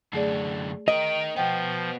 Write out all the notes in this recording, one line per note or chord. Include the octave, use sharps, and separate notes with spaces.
F#2 D3 A3 G#4 D5
D#4 A#4 D#5 G5
B2 F3 B3 G5